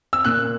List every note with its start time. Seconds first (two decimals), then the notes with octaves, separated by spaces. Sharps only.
0.13 E6
0.25 A#2 F#6